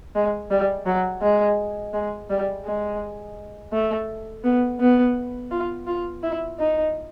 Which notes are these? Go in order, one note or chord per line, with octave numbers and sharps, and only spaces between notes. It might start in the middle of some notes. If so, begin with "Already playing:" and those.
G#3
G3
F#3
G#3
G#3
G3
G#3
A3
B3
B3
F4
F4
E4
D#4